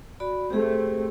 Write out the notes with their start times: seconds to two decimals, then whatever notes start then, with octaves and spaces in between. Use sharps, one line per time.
0.20 F#4 D5 B5
0.50 A3 C4 G4 G#4